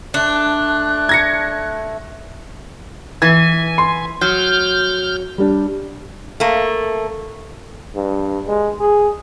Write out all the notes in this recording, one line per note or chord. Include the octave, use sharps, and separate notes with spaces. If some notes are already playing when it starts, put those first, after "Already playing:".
A3 D4 F#6
G#6 A#6 C#7
E3 G#5 G#6
C6
F#3 F6 G6
G3 D4
A3 A#3
G2
G#3
G#4